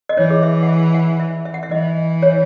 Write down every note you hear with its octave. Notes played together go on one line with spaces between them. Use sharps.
D#5
E3 C#5
G#4
E5
F#5
E5
F#5
E5
E5
F#5
E5
E3 D#5
C#5